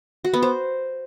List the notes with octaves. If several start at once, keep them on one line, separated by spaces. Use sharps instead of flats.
F#4
B3
C5